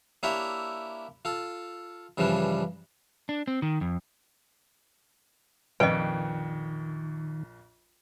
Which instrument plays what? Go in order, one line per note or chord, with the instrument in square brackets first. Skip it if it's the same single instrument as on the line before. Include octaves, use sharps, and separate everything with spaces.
[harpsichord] A#3 D4 E4 G4 C#5 E5
F4 A4
G2 C#3 E3 F3 G3 D4
[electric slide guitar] D4
C4
D#3
F2
[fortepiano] A#1 F2 [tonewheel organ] D#3 [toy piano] B4 D#5 [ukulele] G5